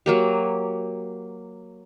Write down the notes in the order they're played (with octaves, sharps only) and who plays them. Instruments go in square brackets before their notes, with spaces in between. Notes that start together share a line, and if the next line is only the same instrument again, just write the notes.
[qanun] F#3 A#3 G4